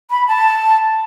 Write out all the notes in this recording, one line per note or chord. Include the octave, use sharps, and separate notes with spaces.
B5
A5